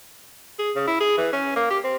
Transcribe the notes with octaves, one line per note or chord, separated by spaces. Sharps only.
G#4
C#3
E4
G#4
E3
C#4
A#3
G4
C4